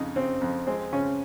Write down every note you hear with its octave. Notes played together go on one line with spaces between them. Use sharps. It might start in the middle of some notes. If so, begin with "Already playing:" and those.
Already playing: F2 C#3 D#4
C#3 C4
F2
G#3 C4
C#3 C#4